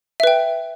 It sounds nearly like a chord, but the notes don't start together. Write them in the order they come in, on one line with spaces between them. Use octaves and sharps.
E5 B4 G5